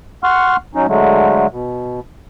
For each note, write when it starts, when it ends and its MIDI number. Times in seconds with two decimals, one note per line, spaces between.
0.24 0.56 78
0.24 0.56 84
0.24 0.56 85
0.24 0.56 89
0.75 0.87 54
0.75 0.87 61
0.75 0.87 63
0.88 1.47 50
0.88 1.47 54
0.88 1.47 56
0.88 1.47 57
1.51 2.00 47